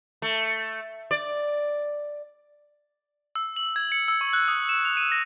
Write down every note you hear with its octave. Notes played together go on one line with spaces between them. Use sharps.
A3
D5
E6
F#7
G#6
C#7
E6
C#6
F#6
D#6
E7
F7
D#7
A#6